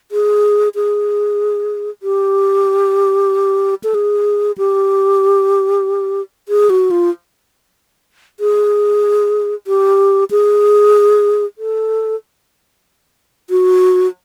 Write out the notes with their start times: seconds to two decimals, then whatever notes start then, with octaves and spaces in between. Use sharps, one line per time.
0.12 G#4
0.75 G#4
2.03 G4
3.84 A4
3.94 G#4
4.58 G4
6.49 G#4
6.70 F#4
6.91 F4
8.40 G#4
9.67 G4
10.31 G#4
11.58 A4
13.50 F#4